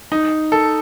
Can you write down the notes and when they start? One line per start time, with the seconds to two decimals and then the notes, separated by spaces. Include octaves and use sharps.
0.12 D#4
0.52 A4